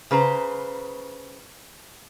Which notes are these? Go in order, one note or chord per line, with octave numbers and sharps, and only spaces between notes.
C#3 B4 C5 A#5